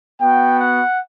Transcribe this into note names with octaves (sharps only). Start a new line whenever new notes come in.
B3 F#4 G5
F#5